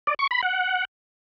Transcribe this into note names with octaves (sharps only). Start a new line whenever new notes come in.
D5
C#6
B5
F#5